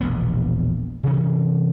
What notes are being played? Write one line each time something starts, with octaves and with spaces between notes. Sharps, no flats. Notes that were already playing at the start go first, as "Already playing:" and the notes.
E1 A#1 B3
C3 E3 C#4